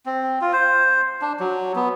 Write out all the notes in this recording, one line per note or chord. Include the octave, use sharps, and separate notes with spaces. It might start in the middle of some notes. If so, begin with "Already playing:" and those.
C4
F4
C5
D4
F#3
B3